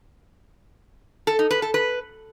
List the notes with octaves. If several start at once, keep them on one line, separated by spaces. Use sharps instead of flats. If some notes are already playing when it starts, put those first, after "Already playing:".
A4
D#4
B4
A4
B4